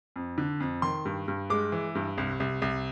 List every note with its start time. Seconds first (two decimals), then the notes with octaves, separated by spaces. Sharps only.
0.16 F2
0.38 D3
0.60 F2
0.82 D#3 C6
1.05 G2
1.28 G2
1.50 G#3 D6
1.72 E3
1.95 G2
2.18 C2
2.40 C2
2.62 C2